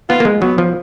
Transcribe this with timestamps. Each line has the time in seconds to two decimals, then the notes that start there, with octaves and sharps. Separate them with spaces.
0.09 B3 F4
0.20 A#3
0.25 G#3
0.41 F#3 B3
0.58 F3